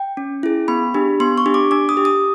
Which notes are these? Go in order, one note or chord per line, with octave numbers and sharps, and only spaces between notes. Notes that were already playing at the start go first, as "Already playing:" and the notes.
Already playing: G5
C#4
E4 G#4
B3 B5
D4 G4
B3 C6
C#6
D4 G4
D6
D4 D6
D#6
G4
D#6